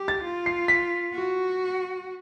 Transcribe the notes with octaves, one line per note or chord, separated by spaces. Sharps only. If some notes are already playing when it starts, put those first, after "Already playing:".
Already playing: G4
A6
F4
C7
B6
F#4